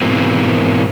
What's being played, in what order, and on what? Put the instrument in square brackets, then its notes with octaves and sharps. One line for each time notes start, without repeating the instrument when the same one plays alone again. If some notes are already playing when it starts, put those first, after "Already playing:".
[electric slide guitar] G#2 B2 E3 A#3 C4